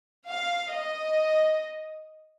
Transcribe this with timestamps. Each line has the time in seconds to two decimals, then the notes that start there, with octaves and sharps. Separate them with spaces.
0.27 F5
0.72 D#5